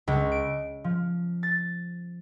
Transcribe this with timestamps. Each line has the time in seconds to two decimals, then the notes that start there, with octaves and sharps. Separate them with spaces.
0.08 C#2
0.32 D7
0.84 F3
1.43 A6